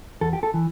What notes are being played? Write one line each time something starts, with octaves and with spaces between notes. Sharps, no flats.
E2 A4
G4
A4
E3